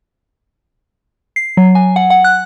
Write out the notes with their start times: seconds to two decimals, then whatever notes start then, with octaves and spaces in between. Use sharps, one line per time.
1.36 C7
1.57 F#3
1.75 G#5
1.96 F#5
2.10 F#5
2.24 F#6